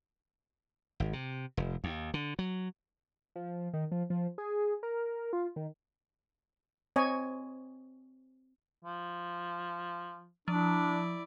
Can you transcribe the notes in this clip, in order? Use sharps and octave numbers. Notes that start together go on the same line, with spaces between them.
G#1
C3
F1
D#2
D3
F#3
F3
D#3
F3
F3
G#4
A#4
F4
D#3
C4 C#5 D#5 G#5
F3
F3 D4 E4 D5